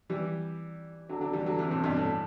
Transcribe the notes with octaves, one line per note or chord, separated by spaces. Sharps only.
E3 G3
D3 F#3
D3 F#3
E3 G3
D3 F#3
C3 E3
A2 C3
G2 B2
A2